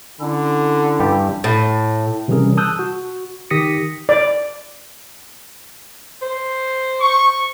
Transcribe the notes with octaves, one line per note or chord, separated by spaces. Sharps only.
D3 C#4 E4 A4
G2 G4 A5
A2
C3 E3 G3 C#4 G#4 A#4
A5 D#6 E6 F#6 G6
F#4
D#3 G4 D#6 A#6 B6 C#7
D5
C5
C#6